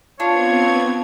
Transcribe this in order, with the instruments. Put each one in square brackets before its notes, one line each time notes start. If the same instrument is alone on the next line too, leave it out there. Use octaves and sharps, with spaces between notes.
[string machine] B3 C4 G#6 [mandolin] D4 [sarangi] F4 [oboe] C#5